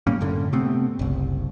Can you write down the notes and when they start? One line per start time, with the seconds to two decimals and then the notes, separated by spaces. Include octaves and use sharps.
0.07 A2 G3 A#3 C#4
0.21 F#2 A2 D3
0.53 C3 A3 B3 C4
0.99 F#1 C2